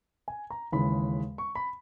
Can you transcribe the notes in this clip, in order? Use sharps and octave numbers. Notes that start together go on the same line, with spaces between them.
G#5
A#5
D#2 C#3 E3 G#3 B5
C#6
B5